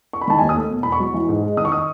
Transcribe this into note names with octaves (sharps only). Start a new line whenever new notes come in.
C#6
B5
D#3 A5
G#5
D#2
D#6
A3
B2
E2 B5
C#6
F#3
E3
G#2
G#3
D#3 D#6
C#6
D#6